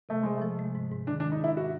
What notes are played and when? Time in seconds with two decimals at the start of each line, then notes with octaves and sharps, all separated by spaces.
0.09 C3 A3
0.23 C3 G#3
0.37 A3
0.42 F3
0.59 G#3
0.75 G#2
0.91 G#2
1.07 D#3 D4
1.20 D4
1.24 G#3
1.32 D#4
1.41 G#2 E4
1.57 F#4